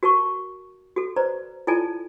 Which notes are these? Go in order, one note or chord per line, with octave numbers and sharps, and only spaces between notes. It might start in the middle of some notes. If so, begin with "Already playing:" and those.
F#4 A#4 A5 C#6
F#4 A4
B4 C5 D5 A#5
E4 F4 A4 D5 G#5 A5